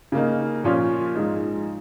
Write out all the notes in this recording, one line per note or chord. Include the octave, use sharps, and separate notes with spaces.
C#3 A#3 D#4
A#2 F3 C#4 F4
G#2 F3 G#3 D#4